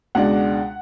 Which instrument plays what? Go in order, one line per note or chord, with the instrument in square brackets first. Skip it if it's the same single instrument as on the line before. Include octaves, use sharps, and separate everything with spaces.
[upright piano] C#2 B2 G#3 D4 F#5